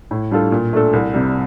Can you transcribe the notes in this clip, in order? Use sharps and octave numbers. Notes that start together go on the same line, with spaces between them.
A2
G3 D4 F4 A4
A#2
A3 D4 A4
C2
C3 G3